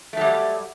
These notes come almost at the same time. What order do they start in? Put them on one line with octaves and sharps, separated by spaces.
A3 F#3 G3